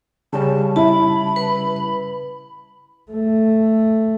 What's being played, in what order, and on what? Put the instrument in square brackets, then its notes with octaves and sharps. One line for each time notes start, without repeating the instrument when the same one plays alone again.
[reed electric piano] C#3 G3 C#4 [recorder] A5
[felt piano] E4 [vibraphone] A5 [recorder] B5
[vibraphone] B4
[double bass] A3